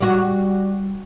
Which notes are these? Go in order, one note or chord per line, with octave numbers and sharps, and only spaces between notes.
G3 F#4